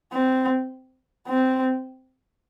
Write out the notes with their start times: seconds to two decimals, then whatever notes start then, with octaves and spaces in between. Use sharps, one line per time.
0.13 C4
1.28 C4